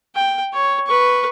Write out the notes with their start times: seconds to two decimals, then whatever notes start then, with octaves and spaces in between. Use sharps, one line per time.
0.15 G5
0.54 C#5
0.87 B4 C#6